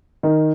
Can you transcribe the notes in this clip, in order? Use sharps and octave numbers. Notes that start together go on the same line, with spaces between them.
D#3